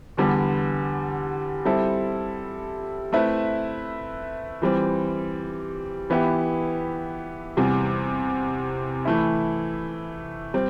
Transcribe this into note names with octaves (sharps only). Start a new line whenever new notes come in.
E2 D3 G3 B3
G3 C4 E4 A4
A3 C4 E4 B4 E5
E3 G3 C4
E3 B3 E4 G4
E2 C3 G3
E3 A3 E4
G3 C4